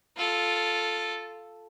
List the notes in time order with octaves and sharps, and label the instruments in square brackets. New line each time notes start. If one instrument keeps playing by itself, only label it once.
[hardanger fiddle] F4 A4